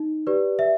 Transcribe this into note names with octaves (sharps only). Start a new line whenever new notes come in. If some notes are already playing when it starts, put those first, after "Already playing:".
Already playing: D#4
G4 B4 D5
E5